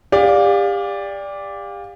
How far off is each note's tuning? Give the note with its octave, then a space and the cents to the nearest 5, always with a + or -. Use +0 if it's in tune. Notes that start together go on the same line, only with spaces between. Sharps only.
G4 +35 D5 -5 F5 +20